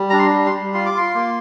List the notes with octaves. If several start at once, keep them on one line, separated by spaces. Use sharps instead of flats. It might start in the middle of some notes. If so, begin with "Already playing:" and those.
Already playing: G3
D4 A#5
C6
G3
C6
G3
F4 C6
D6
F4 C6
A#3